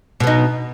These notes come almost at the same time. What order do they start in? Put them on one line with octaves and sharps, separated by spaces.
B2 B3 D#4